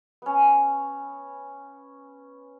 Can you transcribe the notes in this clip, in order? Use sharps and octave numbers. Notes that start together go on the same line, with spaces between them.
B3 C#4